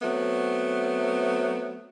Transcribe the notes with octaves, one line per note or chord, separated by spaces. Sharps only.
F#3 A3 B3 C4